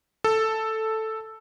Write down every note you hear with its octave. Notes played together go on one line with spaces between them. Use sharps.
A4